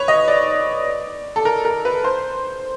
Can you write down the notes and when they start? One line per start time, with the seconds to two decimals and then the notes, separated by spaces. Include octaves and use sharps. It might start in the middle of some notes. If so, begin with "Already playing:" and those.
Already playing: B4 C#5
0.08 D#5
0.28 D5
1.36 A4
1.45 A#4
1.65 A#4
1.85 B4
2.04 C5